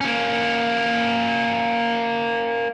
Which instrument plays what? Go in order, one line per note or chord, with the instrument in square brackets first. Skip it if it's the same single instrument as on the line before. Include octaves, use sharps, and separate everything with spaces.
[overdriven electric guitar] A#3 C#4